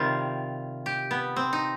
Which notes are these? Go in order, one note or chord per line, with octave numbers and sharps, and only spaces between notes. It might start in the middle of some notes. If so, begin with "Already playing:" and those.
Already playing: C3 D#3 G3 F4
G4
B3
C4
D#4